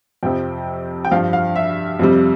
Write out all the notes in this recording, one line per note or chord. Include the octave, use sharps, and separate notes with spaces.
F2 C3 F3 G5
G5
G2 F3 F5
F5
E5
F2 C3 G3